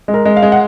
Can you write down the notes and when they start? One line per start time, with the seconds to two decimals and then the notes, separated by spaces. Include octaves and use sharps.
0.08 G#3
0.14 A#4
0.25 G#3
0.37 F5
0.43 G#3
0.52 F#5